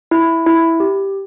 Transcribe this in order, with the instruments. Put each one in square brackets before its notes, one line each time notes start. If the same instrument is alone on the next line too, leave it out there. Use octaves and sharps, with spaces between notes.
[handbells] E4
E4
G4